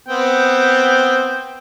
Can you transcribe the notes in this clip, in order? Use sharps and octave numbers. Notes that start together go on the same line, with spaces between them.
B3 C4 G5